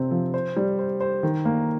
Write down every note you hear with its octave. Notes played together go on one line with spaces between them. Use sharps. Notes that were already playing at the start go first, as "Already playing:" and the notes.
Already playing: C3 C4
F3
C5
G3
C5
C5
D#3
A#3